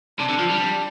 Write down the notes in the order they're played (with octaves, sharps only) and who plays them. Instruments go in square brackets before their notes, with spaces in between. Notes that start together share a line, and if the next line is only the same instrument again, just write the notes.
[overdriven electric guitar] C3 [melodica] D4
[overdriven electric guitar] D3
F3
G3